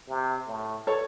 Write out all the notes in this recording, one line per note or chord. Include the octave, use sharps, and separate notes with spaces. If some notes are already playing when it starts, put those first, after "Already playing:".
C3
A2
A4 C#5